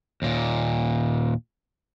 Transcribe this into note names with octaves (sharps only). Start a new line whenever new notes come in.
D#2 A#2